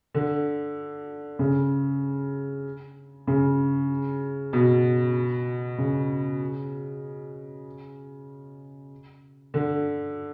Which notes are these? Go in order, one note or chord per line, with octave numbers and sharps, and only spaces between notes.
D3
C#3
C#3
B2
C#3
D3